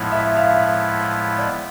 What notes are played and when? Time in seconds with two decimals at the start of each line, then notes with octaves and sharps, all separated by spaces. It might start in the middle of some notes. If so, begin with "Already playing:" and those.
Already playing: A2 F3 G#3 B3 E4
0.12 E5
0.37 F5
0.54 E5
1.38 D5